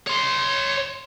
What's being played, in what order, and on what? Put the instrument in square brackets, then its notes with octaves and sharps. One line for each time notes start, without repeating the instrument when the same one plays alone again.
[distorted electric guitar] C#5 C6